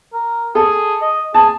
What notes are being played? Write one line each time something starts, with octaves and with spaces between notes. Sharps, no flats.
A#4
G#4 A4
D#5
G#4 A5